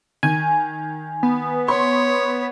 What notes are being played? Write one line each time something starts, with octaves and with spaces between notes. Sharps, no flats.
D#3 G#5
B3
C#5 C6 C#6